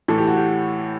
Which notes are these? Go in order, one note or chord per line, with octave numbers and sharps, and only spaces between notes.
A2 E3 A3 A4
G4
F#4
G4